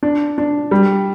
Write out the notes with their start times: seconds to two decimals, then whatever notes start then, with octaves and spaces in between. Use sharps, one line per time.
0.03 D4
0.38 D4
0.71 G3